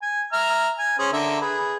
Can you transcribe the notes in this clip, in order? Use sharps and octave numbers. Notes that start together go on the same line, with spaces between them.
G#5
E5 A#5 F6
G#5
C#4 G#4 C5
D3 A#4 E5
G#4 B4